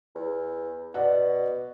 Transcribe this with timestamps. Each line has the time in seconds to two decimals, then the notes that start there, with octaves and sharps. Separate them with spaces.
0.15 E2
0.94 B2 D5 F#5